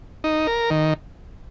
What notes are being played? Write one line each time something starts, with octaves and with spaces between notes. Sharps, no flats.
D#4
A#4
D#3